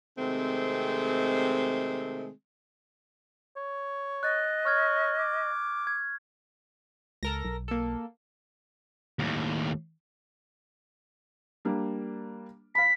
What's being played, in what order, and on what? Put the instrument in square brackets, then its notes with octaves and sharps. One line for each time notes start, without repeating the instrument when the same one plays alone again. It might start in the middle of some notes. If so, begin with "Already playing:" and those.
[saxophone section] C3 D#3 G#3 A3 C4
[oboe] C#5
[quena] D#5 [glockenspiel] F#6 A6
[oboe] C#5 [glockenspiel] C#6 F6 G#6
[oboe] D6
[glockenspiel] G#6
[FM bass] C#2 [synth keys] A4 A#4 A#6
[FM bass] B1
[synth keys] A#3 A4
[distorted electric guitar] D#2 A2
[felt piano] G3 A#3 D4
[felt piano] F5 B5 [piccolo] B6